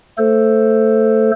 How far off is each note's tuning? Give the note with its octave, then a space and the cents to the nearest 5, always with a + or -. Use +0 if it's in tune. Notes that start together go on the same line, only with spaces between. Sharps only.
A3 +15 A4 +0 C5 +0